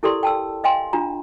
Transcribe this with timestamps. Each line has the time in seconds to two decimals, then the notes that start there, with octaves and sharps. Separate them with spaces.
0.03 E4 G4 A4 A#4 D5 C6
0.23 G5 A5 E6
0.64 D#5 F5 G5 G#5 C6
0.93 D4 F4 A#5